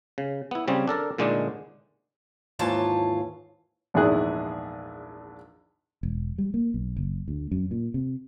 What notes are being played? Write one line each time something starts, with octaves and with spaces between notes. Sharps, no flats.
C#3
B3 E4
C#3 G3 C4 C#4 G#4
D4 A4 A#4 D5
A#2 D3 G#3 A3 D4 D#4
D#2 G#2 E3 F4 C#5 A5
A#1 E2 G#2 E4 G#4 F#6
E1
G3
A#3
B1
F#1
D2
F#2
A#2
C3